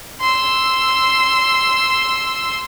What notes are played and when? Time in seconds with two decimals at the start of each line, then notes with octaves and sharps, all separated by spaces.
0.21 C6 E6